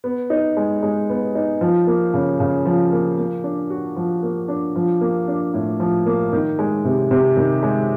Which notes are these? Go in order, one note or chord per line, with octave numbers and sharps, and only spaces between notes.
B3
D#4
G#3
G#3
B3
D#4
F3
A#3
C#3
C#3
F3
A#3
A#3
D4
F#4
F3
A#3
D4
F3
A#3
D4
A2
F3
A#3
D#3
G#3
C3
C3
D#3
G#3